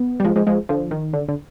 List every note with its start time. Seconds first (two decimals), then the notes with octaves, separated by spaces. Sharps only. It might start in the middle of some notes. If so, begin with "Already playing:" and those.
Already playing: B3
0.20 G3
0.24 F3 G#3
0.36 F3 G#3
0.47 F3 G#3
0.69 D3 F3
0.91 D#3
1.13 D3
1.28 D3